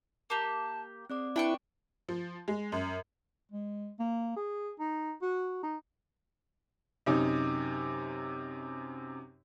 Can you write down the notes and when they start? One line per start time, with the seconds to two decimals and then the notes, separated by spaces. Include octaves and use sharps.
0.30 A#3 G4 A5
1.10 C4 G#4 D5 D6
1.36 D4 E4 B4 G5 C#6
2.09 F3
2.48 G#3
2.72 F#2
3.52 G#3
3.99 A#3
4.36 G#4
4.79 D#4
5.22 F#4
5.63 D#4
7.06 F#2 C3 D#4